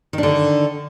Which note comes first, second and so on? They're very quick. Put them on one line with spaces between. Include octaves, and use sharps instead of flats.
D#3 D4 D3